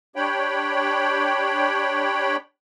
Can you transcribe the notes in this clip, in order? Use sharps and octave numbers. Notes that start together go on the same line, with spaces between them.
D4 G4 C#5 G5 B5